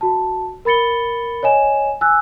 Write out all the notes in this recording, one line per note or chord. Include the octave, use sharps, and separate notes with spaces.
F#4 A5
A#4 B5 A6 C#7 G7
C#5 D#5 G#5 E7
G#5 E6 F#6